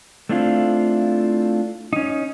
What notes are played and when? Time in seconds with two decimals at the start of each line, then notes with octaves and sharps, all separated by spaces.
0.29 A3 C4 D4 E4 F4
1.93 C#4 D#4